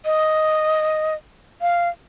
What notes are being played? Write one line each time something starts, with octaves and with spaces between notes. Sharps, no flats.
D#5
F5